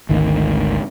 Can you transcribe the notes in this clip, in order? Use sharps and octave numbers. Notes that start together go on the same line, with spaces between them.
G#1 D2 D#3